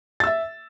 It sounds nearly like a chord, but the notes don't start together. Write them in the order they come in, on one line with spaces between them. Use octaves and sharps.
A6 E6 E5